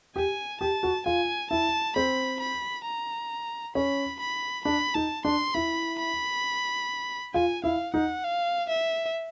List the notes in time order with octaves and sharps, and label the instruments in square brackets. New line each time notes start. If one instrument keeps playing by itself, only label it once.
[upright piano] G4 [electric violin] G#5
[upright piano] G4 [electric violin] A5
[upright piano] F#4
[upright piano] F4 [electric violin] G#5
[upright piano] E4 [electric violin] A5
[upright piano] C4 [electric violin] B5
[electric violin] B5
A#5
[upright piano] C#4 [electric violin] B5
[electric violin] B5
[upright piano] D4 [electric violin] B5
[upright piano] D#4 [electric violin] A5
[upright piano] D4 [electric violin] C6
[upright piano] E4 [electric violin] B5
[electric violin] B5
[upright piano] F4 [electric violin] G#5
[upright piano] E4 [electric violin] F5
[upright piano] D#4 [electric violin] F#5
[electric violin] F5
E5